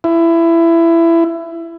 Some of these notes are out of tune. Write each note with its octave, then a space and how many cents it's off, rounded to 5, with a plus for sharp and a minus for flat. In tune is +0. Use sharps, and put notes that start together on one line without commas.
E4 +20